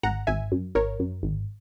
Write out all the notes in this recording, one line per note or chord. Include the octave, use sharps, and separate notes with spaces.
G#1 F#5 A#5
G#1 E5 G#5
F#2
G#1 A#4 C#5
F#2
G#1